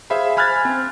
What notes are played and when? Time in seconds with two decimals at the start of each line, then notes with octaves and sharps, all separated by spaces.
0.10 G#4 C5 E5 F5 B5
0.37 G#5 B5 F6 F#6 G#6 A6
0.65 C4